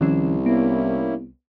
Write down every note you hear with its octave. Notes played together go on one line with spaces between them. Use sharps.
C2 D#3 F3 C#4
A#3 B3 C#4 E4